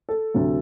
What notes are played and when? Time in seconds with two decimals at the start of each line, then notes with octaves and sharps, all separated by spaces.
0.09 A4
0.34 D2 C3 F#3